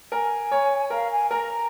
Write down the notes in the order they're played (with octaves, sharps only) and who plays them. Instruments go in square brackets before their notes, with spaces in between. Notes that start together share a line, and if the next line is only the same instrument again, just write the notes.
[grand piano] A#4 [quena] G#5
[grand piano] C#5
[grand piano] A#4 [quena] F5
[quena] G#5
[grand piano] A#4 [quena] A#5